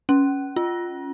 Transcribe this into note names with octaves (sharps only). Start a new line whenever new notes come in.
C#4
F4